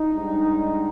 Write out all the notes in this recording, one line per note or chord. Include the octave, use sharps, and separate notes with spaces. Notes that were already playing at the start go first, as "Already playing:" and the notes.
Already playing: D#4
G#2 G3 D4